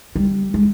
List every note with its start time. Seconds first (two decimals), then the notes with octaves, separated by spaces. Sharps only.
0.16 G3
0.54 G#3